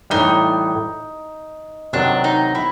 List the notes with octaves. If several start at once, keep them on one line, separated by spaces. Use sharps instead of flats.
A2 E3 G3 D#4
C3 D#3 F#3 D4
D#4
E4